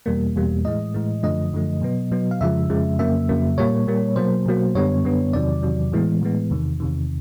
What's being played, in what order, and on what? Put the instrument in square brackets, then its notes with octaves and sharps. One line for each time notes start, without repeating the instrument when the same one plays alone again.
[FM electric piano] E2 B2 G3 A#3
E2 B2 G3 A#3
A2 E3 G#3 D#5
A2 E3 G#3
F#2 D3 F3 A3 D#5
F#2 D3 F3 A3
B2 F#3 B3
B2 F#3 B3
F5
F2 C#3 F3 G#3 E5
F2 C#3 F3 G#3
F2 C#3 F#3 A#3 E5
F2 C#3 F#3 A#3
A#2 G3 A#3 C#5
A#2 G3 A#3
B2 F#3 A#3 C5
B2 F#3 A#3
F#2 D3 G3 B3 C#5
F#2 D3 G3 B3
E2 C3 D#3 F#3 D5
E2 C3 D#3 F#3
A2 E3 G#3 B3
A2 E3 G#3 B3
E2 C3 D#3
E2 C3 D#3